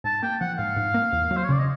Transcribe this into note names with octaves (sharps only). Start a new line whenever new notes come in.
G#2 A5
A#3 G5
F3 F#5
G#2 F5
G#2
A#3
E2
F#3
C5
C#5
C#3 D5
D#5